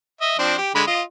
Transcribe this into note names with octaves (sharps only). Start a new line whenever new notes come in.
D#5 E5
F3 C4 D4
G4
D3 G#3 B5
F4 D#5